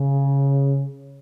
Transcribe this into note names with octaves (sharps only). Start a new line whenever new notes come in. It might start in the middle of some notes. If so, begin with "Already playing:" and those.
Already playing: C#3